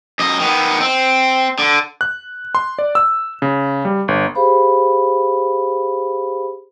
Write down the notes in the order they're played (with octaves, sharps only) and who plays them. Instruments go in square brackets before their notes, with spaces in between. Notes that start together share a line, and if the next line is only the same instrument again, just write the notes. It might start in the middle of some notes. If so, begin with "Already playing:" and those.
[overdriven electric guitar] F#2 D#5
D#3 B3
C4
D3
[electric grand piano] F#6
C6
D5
E6
C#3
G3
G1
[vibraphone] G4 G#4 C5 F5 B5